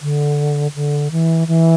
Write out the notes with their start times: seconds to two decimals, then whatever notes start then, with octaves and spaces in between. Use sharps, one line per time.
0.02 D3
0.75 D3
1.11 E3
1.48 E3